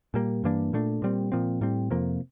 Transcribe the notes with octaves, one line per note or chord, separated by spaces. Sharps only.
A#2 G3 A#3
G2 E3 A#3 D4
A#2 A3 D4
A#2 G3 C4
A#2 F3 C4
A2 G3 C4
F2 C3 F3 A#3